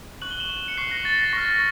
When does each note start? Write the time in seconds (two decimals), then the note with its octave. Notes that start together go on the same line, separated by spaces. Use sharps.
0.22 C#6 F#6 F#7
0.31 G7
0.40 E7 F#7
0.68 C#7
0.77 C#6 F#6 C7
0.91 A#6
1.05 A6
1.19 A#6
1.32 C#6 F6 A#6